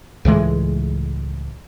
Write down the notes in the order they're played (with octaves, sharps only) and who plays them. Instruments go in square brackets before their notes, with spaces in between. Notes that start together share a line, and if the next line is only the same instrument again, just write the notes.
[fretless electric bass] C#2 A2 E3 G#3